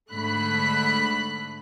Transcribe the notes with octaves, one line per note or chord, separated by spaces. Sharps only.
G#2 D3 A3 B5 F#6 B6